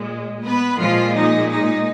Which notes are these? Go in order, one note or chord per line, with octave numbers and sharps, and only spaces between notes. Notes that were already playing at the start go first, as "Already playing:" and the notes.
Already playing: A#2 G#3
B3 B4
A#2 F3 G#3 F4
D#4
D#4